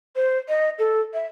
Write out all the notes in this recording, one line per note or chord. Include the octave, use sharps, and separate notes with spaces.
C5
D#5
A4
E5